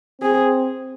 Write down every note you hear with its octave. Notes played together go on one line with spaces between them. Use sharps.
C4 G#4